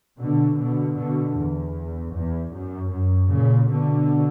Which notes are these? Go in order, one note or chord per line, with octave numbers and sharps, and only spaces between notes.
B2 D3
B2 D3
B2 D3
E2
E2
F#2
F#2
A#2 C#3
B2 D3